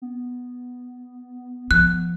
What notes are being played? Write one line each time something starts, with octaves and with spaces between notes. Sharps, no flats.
B3
F3 F#6